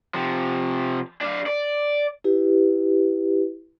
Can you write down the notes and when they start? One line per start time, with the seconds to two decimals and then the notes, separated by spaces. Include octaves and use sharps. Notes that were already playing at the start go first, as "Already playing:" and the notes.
0.14 C3 F3
1.21 D4 F5
1.46 D5
2.24 E4 G4 B4